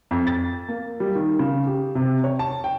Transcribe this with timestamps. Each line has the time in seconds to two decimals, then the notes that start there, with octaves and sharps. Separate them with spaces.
0.11 F2
0.27 A6
0.69 A#3
1.00 G3
1.15 D#3
1.39 C#3
1.67 G4
1.95 C3
2.24 C#5
2.39 A5
2.64 G5